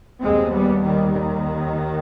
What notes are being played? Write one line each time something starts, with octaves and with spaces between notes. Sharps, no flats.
D#2 G#3 C4
G3 B3
D#3 G3
D#3